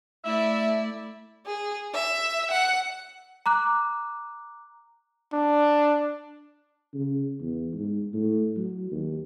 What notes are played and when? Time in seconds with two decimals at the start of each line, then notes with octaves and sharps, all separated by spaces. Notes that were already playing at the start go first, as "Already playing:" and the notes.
0.25 A3 E4 D5 E5
1.46 G#4
1.94 E5
2.51 F#5
3.46 A#5 D6 F#6
5.33 D4
6.94 C#3
7.40 E2
7.74 G#2
8.14 A2
8.57 F#3
8.92 D#2